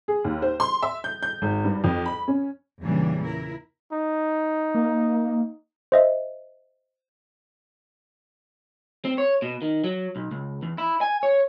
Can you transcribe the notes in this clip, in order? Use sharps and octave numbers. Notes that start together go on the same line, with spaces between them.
G#4
D#2
C5
C6
E5
G6
G6
G#1
G2
F2
B5
C#4
E2 A#2 C#3 E3 G3 D4
E4 A#4
D#4
A#3
C5 D#5 E5
C4
C#5
B2
D#3
F#3
B1
C#2
E2
E4
G#5
C#5